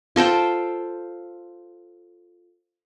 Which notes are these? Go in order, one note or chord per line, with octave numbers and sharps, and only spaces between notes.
F4 A4 C5 G5